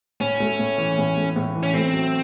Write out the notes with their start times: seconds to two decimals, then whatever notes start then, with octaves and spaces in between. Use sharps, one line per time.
0.20 A2 C#4
0.40 A3
0.59 A2
0.78 E3
0.98 A2
1.17 A3
1.36 A2
1.55 E3
1.63 C#4
1.74 A3 C4
1.93 F#3